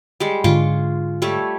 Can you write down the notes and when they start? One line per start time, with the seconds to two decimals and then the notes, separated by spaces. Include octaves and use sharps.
0.20 G3 G#3
0.44 G#2 D3 F4 C#6 D6
1.22 G3 A3 C#5